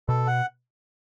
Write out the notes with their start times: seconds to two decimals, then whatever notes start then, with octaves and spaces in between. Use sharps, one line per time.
0.09 B2 A4
0.27 F#5